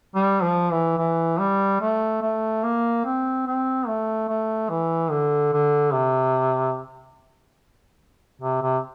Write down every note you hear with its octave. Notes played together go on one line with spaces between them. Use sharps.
G3
F3
E3
E3
G3
A3
A3
A#3
C4
C4
A3
A3
E3
D3
D3
C3
C3
C3